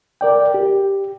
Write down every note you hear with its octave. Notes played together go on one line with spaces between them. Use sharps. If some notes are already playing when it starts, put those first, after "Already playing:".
A#4 D5 G5
G4